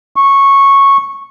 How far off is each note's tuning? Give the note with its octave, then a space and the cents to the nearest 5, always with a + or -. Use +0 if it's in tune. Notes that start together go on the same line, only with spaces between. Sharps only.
C#6 -10